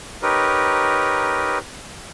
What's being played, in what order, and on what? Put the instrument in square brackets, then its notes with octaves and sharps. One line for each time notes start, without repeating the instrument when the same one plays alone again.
[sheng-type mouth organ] D#4 G4 A#4 B4 C#5